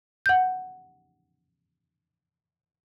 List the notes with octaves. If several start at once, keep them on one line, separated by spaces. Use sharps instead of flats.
F#5 G6